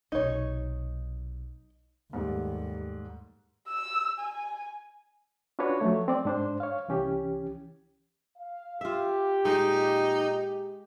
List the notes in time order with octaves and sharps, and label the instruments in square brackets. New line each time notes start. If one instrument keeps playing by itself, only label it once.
[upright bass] B1 C3 [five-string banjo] D#4 C#5
[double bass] D#2 [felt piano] G#2 G3 A3
[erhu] E6
G#5
[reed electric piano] C#4 D4 F4 F#4 B4 C#5
F3 F#3 A3 C#5
C4 D5
G#2 D4 C5
C#5 F5
C2 E3 C#4 G4
[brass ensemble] F5
[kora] F4 E5 [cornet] G4
[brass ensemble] A#2 [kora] G#3 [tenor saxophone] D#4